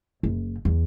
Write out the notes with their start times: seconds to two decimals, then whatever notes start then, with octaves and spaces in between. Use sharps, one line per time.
0.23 F#1
0.65 E2